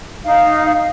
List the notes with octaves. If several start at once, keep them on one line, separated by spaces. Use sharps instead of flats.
D#4 F5